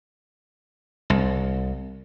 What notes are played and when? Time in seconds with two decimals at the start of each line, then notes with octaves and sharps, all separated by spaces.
1.10 C2